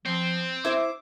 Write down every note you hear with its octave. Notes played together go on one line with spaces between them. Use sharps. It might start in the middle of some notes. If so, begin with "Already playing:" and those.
F3 C4
E4 C5 E5 D6